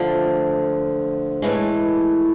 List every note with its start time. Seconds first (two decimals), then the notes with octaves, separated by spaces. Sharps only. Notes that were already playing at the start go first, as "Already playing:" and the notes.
Already playing: D3 F3 A3
1.42 A2 E3 G#3